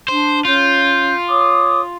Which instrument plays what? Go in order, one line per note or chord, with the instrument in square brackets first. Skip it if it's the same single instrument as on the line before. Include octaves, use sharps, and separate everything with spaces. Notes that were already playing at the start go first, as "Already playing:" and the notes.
[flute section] D4 [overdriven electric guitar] C5
[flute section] C#4 G6 [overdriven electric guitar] F4
[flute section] C#5 D6 D#6